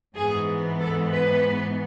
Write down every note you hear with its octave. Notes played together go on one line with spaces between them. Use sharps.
G#2 E3 B3 G#4
A4
B4